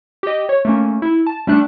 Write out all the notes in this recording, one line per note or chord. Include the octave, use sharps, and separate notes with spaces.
G4 D#5
C#5
A3 A#3 C#4
E4
A5
G3 A3 D4 F#6